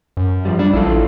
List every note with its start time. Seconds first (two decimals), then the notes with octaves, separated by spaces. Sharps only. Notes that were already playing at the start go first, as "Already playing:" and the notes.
0.17 F#2
0.45 F3 G3
0.59 G3 D4
0.73 A#1 E4 F4 A4
0.86 A1